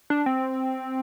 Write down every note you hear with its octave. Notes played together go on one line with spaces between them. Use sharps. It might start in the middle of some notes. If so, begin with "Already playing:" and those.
D4
C4